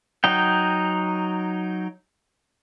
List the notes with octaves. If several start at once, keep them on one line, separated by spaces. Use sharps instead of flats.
F#3 D#4 G5